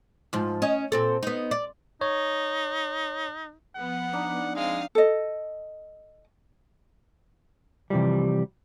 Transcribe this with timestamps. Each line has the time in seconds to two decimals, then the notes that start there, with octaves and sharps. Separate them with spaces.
0.33 G#2 F3
0.62 C#4 D#5
0.92 A#2 C4 A4
1.23 B3 D#4
1.51 D5
2.01 D#4 C#5
3.76 F3 B3 F#5
4.13 D4 D#4
4.56 F3 G#3 C4 F5 D#6
4.95 A4 D#5
7.90 C3 E3 F3 G3